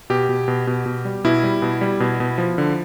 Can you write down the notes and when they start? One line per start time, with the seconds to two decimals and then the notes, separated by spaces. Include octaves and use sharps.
0.10 B2 G4
0.29 B2
0.48 B2
0.67 B2
0.86 B2
1.05 G3
1.24 B2 E4
1.43 G3
1.62 B2
1.81 G3
2.00 B2
2.20 B2
2.38 F3
2.58 D3